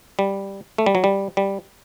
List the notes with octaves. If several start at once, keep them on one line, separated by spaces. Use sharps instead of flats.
G3
A3
G3
F#3
G3
G3